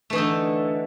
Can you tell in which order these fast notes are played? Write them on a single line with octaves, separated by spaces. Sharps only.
A3 E3 D#4 D3